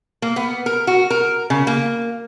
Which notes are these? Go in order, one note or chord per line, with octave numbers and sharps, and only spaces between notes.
A#3
B3
A#4
F#4
A#4
C#3
A#3